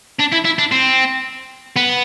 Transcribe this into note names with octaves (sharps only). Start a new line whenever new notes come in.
D4
E4
E4
D4
C4
B3